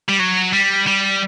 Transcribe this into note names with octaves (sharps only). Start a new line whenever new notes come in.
G3
F#3
G3
G3